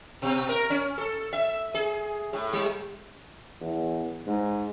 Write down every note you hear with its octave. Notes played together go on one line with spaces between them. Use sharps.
B2
A#4
C#4
A4
E5
G#4
A2
G3
E2
G#2